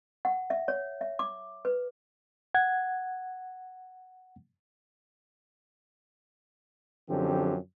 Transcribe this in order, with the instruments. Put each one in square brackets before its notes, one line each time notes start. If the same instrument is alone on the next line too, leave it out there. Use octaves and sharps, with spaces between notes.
[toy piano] F#5
E5
C#5
E5
D6
B4
[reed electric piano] F#5 G#6
[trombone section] F#2 D3 F3 C4 G4